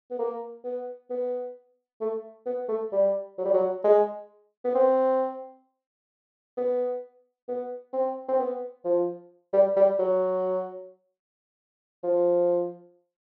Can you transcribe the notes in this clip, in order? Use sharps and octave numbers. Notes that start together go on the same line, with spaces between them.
B3
A#3
B3
B3
A3
B3
A3
G3
F#3
G3
F#3
G#3
B3
C4
B3
B3
C4
C4
B3
F3
G3
G3
F#3
F3